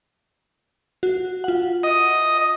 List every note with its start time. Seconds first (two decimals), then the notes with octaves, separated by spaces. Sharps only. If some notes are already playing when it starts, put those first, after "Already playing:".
1.03 F#4
1.44 F4 F#5
1.83 D#5